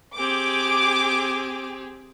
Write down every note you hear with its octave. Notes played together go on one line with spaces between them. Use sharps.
C4 G4 G#4 D6